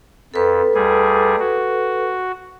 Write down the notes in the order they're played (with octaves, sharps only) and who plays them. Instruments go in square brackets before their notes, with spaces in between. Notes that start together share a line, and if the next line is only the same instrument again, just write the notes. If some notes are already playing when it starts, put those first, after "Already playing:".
[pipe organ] F2 [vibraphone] A4 B4
[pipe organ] D2 G3 G#4
F#4